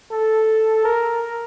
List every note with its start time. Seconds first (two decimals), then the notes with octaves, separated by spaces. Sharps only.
0.11 A4
0.85 A#4